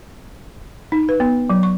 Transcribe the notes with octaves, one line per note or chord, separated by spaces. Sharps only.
D#4
B4
B3
F#3
C#6